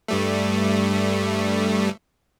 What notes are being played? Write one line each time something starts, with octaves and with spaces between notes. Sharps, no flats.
G2 G3 A3